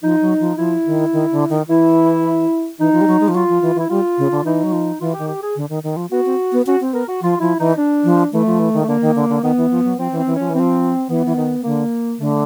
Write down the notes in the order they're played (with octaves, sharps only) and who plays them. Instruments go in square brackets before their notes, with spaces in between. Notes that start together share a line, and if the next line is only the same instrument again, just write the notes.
[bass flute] F3 [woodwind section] D#4
[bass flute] F#3
F3
[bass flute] F3 [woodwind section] E4
[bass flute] D#3
D#3
D3
D#3
[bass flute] E3 [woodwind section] E4
[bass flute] E3 [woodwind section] D#4
[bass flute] F3
G3
F#3
G#3
F3
[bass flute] F#3 [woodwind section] F4
[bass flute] F3
E3
[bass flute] E3 [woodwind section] E4
[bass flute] G3 [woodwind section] F4
[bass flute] C#3
D3
[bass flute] E3 [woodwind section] D#4
[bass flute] F#3
F3
[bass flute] E3 [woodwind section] F4
[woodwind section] G4
[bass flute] D#3
[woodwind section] G4
G#4
[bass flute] D3
D#3
D#3
F3
[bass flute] B3 [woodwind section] F#4
[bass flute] C4
B3
[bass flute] C#4 [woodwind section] F#4
[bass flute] C4
[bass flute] B3 [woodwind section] A#4
[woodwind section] F#4
[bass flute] F3 [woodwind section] F4
[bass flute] F3 [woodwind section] E4
[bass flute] E3 [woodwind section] D#4
[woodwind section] D4
[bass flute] F3
[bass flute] E3 [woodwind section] A3
[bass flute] F3
E3
D#3
[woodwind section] A3
[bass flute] D3 [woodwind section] A#3
[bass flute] D#3
D3
D3
[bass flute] D#3 [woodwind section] B3
[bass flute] E3
F3
F#3
[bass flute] F3 [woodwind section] C4
[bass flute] E3
[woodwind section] C4
[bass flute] E3
[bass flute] F3 [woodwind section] C#4
[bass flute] E3 [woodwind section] C4
[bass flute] F3
[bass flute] E3 [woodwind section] B3
[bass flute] E3
D#3
[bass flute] D3 [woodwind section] A#3
[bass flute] D3 [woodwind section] A3